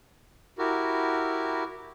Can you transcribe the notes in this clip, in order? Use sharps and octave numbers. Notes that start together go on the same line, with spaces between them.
E4 F#4 G4 A#4